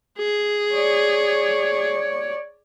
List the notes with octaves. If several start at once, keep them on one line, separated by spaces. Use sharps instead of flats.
G#4
C#5 D5